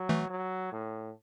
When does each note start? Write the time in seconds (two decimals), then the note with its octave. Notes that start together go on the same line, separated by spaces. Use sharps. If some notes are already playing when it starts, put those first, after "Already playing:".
Already playing: F#3
0.09 E3 A3
0.30 F#3
0.72 A2